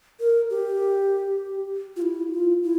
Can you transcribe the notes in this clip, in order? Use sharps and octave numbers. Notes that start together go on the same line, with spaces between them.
A#4
G4
F4
E4
F4
E4